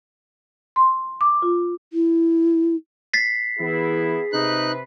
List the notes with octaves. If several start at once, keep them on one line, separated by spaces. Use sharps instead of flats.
C6
D6
F4
E4
A6 B6 C7
E3 B3 E4 G#4
C3 D#4 B4 F#6